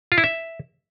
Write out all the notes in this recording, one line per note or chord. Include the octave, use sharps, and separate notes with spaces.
F4
E4
E5